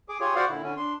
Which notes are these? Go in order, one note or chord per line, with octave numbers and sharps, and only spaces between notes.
G#4 D6
F4 G4 G#4 C#5
F#4 C5 D5 F5 F#5
A#2 D3 E4
D3 C#4
D4 C6